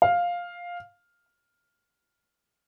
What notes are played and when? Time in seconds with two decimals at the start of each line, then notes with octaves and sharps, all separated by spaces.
0.02 F5